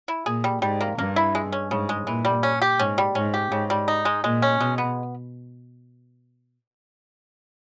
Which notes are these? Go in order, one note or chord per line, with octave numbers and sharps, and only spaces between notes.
E4
A#2 G#4
G3
G#2 G3
A#3
G2 A#3
E4
G#3
C#4
G#2 C#3
G#3
A#2 E3
G3
C#4
G4
G#2 C#4
G3
G#2 C#4
G4
G#2 C#3
G3
D#4
G#3
A#2 G#3
C#4
B2 G#3
B3